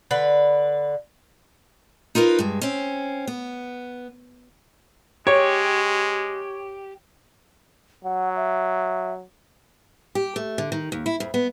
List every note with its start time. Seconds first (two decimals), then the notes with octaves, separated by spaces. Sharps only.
0.11 D3 B4
2.15 D#4 F4 A#4 B4
2.39 G2 G#3
2.61 C4 C#4
3.27 B3
5.27 G#3 G4 C#5
8.04 F#3 F#5
8.36 E5
10.15 G4
10.36 A3
10.58 D3
10.72 D#3
10.92 D#2
11.06 E4
11.20 F2
11.34 B3